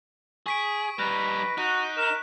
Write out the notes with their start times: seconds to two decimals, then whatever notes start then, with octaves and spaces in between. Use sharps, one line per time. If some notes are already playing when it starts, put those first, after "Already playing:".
0.46 G#4 C#6 B6 D7
0.99 G3 D#4 B4 A#6
1.58 D#4 F#4 F#6 D#7
1.97 A#4 E7